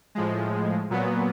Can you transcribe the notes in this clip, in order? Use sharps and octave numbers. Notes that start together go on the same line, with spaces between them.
A2 F3 G#3
A#2 F#3 B3